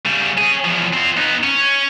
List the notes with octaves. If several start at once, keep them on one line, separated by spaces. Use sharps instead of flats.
C#3 G3
C#4 G#4
E2 F3
C4 F4
B3 D#4
C#4